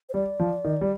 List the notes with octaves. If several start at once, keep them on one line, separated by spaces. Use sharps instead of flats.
C5
G3 D5
F3
D#3
G3